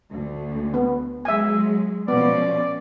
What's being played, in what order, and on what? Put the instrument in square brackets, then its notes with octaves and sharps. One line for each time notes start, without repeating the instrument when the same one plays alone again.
[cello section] D2
[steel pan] B3
[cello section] F#3 G#3 [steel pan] E5 G#5
[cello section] B2 F3 C#4 [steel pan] B3 [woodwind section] D5